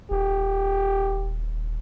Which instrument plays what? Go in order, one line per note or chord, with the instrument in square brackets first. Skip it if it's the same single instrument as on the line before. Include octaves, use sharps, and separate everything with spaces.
[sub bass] D#1 [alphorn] G4